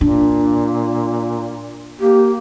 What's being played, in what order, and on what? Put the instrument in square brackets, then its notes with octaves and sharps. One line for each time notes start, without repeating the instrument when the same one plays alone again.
[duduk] A#2 [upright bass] D4
[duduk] A#3 [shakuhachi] G4